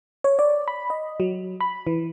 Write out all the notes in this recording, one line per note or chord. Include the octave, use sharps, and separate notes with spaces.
C#5
D5
B5
D#5
F#3
B5
E3